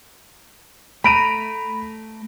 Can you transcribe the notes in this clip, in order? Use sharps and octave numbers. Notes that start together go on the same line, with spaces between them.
A3 A#5 B5 D7 D#7